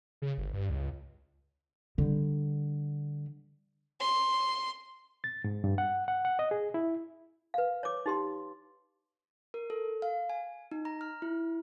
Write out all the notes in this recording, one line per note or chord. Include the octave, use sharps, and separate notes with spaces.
C#3
G1
G2
C#2
D3 G3
C6
A6
G#2
G2
F#5
F#5
F#5
D#5
G#4
E4
B4 F5
C#5 D6
D#4 G4 C6
A#4
A4
F5
G#5
D#4
A#5
F6
E4